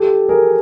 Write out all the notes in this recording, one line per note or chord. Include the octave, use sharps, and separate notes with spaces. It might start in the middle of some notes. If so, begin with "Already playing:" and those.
Already playing: G4 A4
G#4 A#4